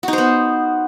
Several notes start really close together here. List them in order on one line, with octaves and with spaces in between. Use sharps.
F#4 D#4 C5 B3